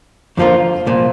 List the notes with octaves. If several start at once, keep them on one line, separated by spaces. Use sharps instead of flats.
F2 D3 F3 A#3 F4
C2 A#2 F3